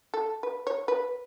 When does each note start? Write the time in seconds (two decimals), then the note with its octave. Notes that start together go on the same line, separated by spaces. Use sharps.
0.14 A4
0.43 B4
0.67 C#5
0.88 B4